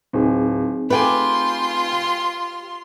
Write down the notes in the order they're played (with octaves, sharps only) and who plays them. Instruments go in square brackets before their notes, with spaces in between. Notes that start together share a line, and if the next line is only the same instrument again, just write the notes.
[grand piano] D1 [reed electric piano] C4 D#4 G#4
[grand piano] A3 G5 G#5 [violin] F4 C6 [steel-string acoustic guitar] G4 B4